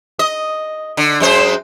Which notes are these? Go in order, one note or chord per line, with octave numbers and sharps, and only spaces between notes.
D#5
D3
F#2 G#3 C5